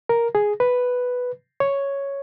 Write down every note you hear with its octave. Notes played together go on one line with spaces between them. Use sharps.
A#4
G#4
B4
C#5